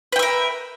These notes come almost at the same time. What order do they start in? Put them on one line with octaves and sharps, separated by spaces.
B4 G5 E5 A#4